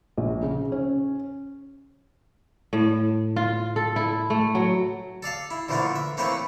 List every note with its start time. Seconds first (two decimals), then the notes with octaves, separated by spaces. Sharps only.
0.17 A#1
0.42 C#3
0.72 C#4
2.73 A2
3.36 F4
3.76 A4
3.96 E4
4.30 A3
4.55 F#3
5.23 A4 D5 F5 A5
5.51 E4
5.69 D3 E3 F3 A3 A#3 D4
5.95 E5
6.17 A3 A#3 C4 E4 B4 C#5